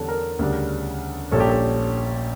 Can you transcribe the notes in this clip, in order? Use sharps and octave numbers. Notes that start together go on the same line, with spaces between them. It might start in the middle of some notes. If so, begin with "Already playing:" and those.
Already playing: E2 D3 G3 C#4 A4
A#4
D2 C#3 G3 D4
A#1 A#2 G3 C#4 A4
G4
A4